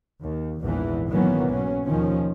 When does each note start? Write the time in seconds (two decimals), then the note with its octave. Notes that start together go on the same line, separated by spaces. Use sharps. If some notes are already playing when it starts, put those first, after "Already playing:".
0.21 D#2
0.62 A#1 E2 G#2 E3
1.09 D#3 E3 F#3 A#3 B3 C#4
1.50 B1 F#3 C#4
1.86 D#2 D#3 F3 C#4